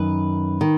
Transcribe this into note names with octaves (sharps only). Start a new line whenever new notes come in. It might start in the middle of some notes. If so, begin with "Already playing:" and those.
Already playing: F#2 D#3 B4
D#3